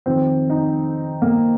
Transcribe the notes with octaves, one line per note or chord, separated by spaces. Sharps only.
F2 D#3 C4
D#4
A#3